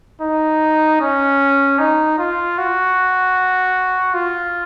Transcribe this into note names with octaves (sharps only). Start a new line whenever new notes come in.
D#4
C#4
D#4
F4
F#4
F4